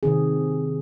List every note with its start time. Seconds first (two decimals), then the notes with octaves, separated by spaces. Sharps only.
0.03 C3 D#3 C4 G#4